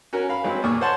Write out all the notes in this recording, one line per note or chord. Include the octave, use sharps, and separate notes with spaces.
C#4 F#4 A#4
F5 B5
E3 F#3 G#3 C4 B4
D#2 A#2 C#6
C5 C#5 F#5 A5 C6 C#6